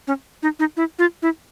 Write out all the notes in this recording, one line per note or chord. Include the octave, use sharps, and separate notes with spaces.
C#4
D#4
D#4
E4
F4
E4